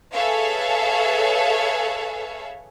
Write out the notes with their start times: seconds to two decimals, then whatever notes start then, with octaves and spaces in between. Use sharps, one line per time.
0.13 G#4 A4 B4 C#5 E5 F5